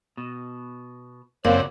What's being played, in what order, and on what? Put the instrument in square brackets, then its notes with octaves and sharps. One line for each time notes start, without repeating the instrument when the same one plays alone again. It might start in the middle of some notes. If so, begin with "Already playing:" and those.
[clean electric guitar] B2
[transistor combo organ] F#2 C4 [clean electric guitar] C#3 F#4 D5 [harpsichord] A#3 [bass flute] C#5